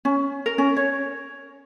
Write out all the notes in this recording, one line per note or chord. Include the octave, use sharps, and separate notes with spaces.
C#4
A#4
C#4
C#5